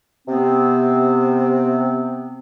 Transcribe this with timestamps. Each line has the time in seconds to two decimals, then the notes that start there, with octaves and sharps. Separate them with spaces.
0.28 C3 B3 C4